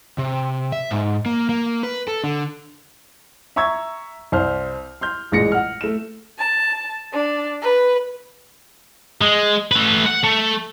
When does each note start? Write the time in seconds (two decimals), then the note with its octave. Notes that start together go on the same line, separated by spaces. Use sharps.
0.18 C3
0.72 E5
0.91 G#2
1.26 A#3
1.49 A#3
1.83 B4
2.08 A4
2.24 D3
3.56 E5 A#5 C#6 E6 G#6
4.32 C2 C5 F6
5.01 C6 F6 G6
5.32 A1 A#2 G#3 A#6 C#7
5.52 F#5 F6
5.81 A3 E7
6.38 A5
7.11 D4
7.62 B4
9.22 G#3
9.72 A3 B4
10.06 F#5
10.24 A3